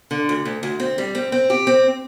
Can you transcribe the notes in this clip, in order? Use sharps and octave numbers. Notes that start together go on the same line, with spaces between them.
D3
D2
D2
D2
C4
G3
C4
C4
G4
C4